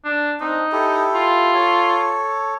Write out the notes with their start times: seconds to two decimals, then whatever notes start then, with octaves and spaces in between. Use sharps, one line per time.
0.04 D4
0.40 C4 D4 D#4
0.72 E4 G4 A4
1.14 F4
1.54 A4 C#5